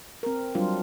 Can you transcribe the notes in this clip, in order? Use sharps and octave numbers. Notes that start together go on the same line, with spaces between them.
C4 A#4
F#3 G3 D4 F4 C5